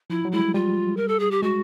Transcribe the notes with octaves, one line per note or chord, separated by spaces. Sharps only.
F3 E4
F#3
G#3 E4
G3
G3 F4
A#4
A4
G#4
G4
G#3 F#4